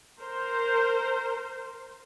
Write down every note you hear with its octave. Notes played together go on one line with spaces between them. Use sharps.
A#4 C5